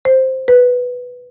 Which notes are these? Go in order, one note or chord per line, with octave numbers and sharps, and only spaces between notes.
C5
B4